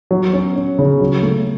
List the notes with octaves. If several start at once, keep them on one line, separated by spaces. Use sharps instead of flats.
F#3
C#4
C#4
C#3
F#3
A3